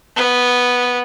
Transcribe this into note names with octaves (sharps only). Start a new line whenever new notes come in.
B3